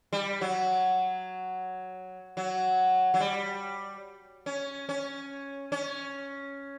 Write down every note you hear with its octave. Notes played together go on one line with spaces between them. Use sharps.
G3
F#3
F#3
F#3
G3
C#4
C#4
C#4